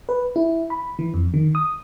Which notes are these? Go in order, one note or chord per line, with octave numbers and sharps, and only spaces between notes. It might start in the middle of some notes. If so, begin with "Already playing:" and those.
B4
E4
B5
E3
F2
D#3
D#6